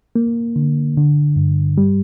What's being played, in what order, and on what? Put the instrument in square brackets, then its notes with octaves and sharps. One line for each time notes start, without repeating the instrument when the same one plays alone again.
[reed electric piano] A#3
D3
D3
G2
G3